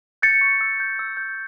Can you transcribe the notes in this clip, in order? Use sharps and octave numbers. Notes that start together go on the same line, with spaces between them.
G6 A6 C#7
C#6
E6
G6
E6
G6